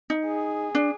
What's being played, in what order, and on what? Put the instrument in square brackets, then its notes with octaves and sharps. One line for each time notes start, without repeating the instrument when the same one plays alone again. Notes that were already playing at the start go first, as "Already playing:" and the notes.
[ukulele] D#4
[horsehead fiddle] G#4
[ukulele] D4